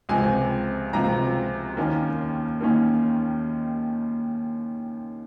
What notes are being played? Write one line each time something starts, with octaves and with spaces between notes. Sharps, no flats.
C#2 C3 F3 C4 G#5
C#2 C3 F3 C4 A#5
D#2 D#3 A#3 C#4
D#2 D#3 A#3 C#4